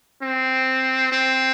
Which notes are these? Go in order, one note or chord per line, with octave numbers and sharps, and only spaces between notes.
C4
C4